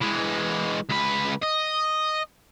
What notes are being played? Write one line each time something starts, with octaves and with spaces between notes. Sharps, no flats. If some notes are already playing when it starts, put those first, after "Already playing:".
E3 G#3
C#2 B4
D#5